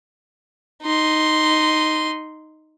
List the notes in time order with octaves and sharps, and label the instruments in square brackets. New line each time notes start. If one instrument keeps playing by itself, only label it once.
[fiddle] D#4 C6